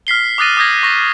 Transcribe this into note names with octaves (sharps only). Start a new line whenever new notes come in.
F6 B6 C7 G7
D6 D#6 F#6 A6 A#6 D#7
D6 D#6 F6 G6 G#6 A#6
C#6 A#6